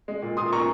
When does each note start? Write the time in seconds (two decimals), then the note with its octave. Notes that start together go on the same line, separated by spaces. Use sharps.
0.08 G#3
0.22 A#2
0.37 A#2 C6 D#6
0.52 A#2 A#5 C#6